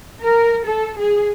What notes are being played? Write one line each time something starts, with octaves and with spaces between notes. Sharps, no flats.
A#4
A4
G#4